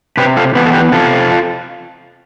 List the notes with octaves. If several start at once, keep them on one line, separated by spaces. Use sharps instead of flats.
C3 G4 B4
F4 A4
E3 B3 G4 B4
A4
G4 B4
C3 F4 A4